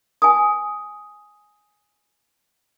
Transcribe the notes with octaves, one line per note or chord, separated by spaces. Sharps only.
G#5 D#6